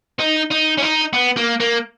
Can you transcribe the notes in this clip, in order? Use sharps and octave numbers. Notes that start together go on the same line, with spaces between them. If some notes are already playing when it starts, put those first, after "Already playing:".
D#4
D#4
C#4
D#4
B3
A#3
A#3